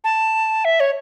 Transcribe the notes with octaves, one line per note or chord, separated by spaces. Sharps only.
A5
E5
C#5